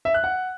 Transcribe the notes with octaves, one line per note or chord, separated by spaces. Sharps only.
E5
F#6
F#5